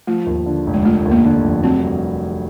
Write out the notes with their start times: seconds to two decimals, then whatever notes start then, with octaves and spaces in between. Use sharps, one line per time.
0.07 F3 A3
0.26 D#2
0.46 D3
0.67 F1
0.74 G#3
0.85 F3 A3
1.05 D#2
1.11 A#3
1.24 D3
1.44 F1
1.63 F#3 C4
1.83 G2